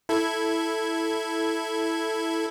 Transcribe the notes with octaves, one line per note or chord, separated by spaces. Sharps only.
E4 A4 G#6